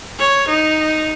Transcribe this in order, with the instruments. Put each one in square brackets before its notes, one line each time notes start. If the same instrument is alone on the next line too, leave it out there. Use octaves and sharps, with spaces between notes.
[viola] C#5
D#4